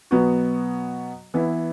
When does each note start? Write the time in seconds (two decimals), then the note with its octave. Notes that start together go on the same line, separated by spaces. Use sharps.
0.11 B2 F#3 B3 F#4
1.34 E3 B3 E4